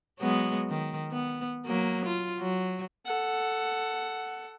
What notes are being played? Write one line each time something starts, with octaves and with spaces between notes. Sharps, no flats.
F#3 G#3 B3
D#3
B3
F#3 A#3
F4
F#3
A4 F#5